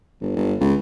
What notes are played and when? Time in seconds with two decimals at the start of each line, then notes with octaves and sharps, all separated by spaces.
0.21 G1
0.36 G1
0.60 C#2